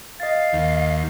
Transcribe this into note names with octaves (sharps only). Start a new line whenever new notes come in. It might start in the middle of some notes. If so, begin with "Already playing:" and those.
D#5 F5 A6
D#2